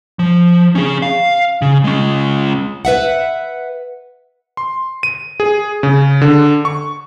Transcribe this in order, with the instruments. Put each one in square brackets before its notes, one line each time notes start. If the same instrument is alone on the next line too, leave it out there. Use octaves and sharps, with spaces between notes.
[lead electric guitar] F3
C#4 G#4
F5
C#3
G#3 C#4
[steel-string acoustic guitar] B4 E5 F#5
[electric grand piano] C6
D#7
G#4
C#3
D3
C#6